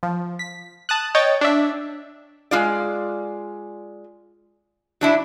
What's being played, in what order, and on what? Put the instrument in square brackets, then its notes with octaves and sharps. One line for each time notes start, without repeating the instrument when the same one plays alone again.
[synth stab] F3
B6
A5 D#6 F#6
C#5 D#5 G5 A6
D4 E5
[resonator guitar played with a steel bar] G#3 F4 D5
F#3 D4 E4